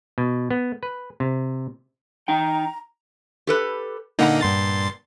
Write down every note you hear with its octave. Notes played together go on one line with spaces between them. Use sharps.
B2
B3
B4
C3
D#4 G5 A#5
G4 A4 B4
A#2 D3 A#3 D#4 F#5 A#5
G2 C6 A6